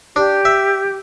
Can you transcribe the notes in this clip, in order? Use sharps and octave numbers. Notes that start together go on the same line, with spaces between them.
D4 G4
E5